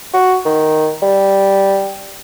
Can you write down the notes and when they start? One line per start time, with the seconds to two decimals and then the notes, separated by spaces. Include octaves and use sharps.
0.14 F#4
0.45 D#3
1.02 G3